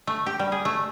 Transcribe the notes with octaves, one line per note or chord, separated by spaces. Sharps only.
A3
G4
G3
G#4
A3